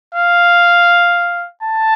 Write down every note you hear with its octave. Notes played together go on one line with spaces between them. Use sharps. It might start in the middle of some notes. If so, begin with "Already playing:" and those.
F5
A5